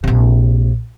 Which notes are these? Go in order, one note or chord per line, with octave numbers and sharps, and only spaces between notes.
A#1 C3